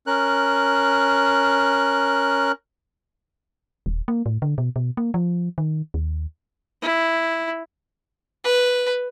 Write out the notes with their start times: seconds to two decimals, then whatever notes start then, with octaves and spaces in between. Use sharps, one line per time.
0.07 C#4 A#4 F#6
3.86 D#1
4.08 A#3
4.26 A2
4.42 D3
4.58 B2
4.76 B2
4.97 A#3
5.14 F3
5.58 D#3
5.94 D#2
6.82 E4
8.44 B4